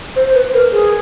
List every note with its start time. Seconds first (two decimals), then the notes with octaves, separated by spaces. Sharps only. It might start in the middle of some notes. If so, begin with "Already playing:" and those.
0.16 C5
0.35 B4
0.54 A#4
0.72 G#4